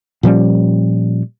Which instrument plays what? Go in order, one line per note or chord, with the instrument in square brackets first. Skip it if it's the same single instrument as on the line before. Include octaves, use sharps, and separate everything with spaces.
[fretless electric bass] A#2 F3 G3 C#4